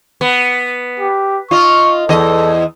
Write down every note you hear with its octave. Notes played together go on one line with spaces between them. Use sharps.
B3
G4
F4 D#5 C#6
E2 A4 D#5